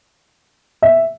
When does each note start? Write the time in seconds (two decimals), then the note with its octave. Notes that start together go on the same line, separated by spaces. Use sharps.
0.82 E5